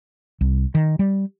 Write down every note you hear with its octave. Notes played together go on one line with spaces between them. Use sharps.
C2
D#3
G3